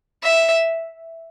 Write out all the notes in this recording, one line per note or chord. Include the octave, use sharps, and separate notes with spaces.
E5